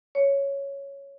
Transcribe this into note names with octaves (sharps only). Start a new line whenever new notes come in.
C#5